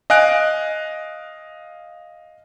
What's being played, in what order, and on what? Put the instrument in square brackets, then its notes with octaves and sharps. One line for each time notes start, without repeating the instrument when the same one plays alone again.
[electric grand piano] D#5 F5 G#5 F#6 D7